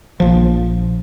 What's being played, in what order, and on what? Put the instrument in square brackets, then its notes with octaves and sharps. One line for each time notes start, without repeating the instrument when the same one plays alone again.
[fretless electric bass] A#1 F3